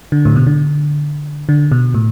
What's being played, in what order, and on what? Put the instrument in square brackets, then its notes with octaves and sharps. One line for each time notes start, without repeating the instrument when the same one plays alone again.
[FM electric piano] D3
A2
B2
D3
D3
B2
A2